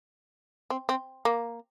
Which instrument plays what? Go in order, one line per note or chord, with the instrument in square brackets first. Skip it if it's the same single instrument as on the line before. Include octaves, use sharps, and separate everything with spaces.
[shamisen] C4
C4
A#3